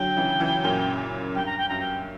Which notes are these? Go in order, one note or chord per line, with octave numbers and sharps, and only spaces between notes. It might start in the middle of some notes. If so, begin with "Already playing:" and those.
Already playing: D3 F#3 G5
C#3 E3
C#3 E3
F#2 A#2
G2 G5
A#5
G5
F#2 A#5
G5